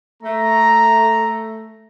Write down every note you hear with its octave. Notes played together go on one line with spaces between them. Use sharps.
A3 A#5